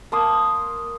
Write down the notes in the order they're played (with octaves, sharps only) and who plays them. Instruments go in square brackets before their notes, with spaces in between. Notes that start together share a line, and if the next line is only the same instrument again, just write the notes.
[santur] A#3 A5 C6 D#6